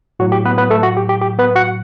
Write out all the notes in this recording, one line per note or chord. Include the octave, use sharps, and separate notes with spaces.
A2 F#3 F#4
G4
B3 B4
B3 B4
A3 A4
F#4
G4
G4
G4
B3 B4
F#4 F#5